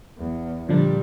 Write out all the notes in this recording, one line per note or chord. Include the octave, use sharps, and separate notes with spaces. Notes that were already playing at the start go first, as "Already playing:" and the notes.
E2
A#2 D3 F3 G3 D4